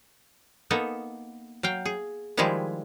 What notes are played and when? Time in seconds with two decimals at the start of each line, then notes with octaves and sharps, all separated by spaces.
0.70 A#3 B3 D#4 A4
1.63 F#3 F5 G5
1.85 G#4
2.37 D#3 F3 G3 G#3 E4 G#4